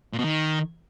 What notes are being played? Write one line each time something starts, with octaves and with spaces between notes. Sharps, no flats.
A#2
B2
D#3